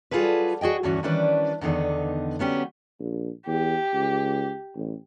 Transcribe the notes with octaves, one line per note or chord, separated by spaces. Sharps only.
F#3 G3 F4 G#4 A4 B4
F#4 G#4 D#5 G5
D2 G2 E3 C#4 F#4
D#3 E3 G3 C#4 D4 B4
E2 D3 D#3 B3 D#4
F#3 B3 C#4 G4
A#1
E2 G4
C#2
A1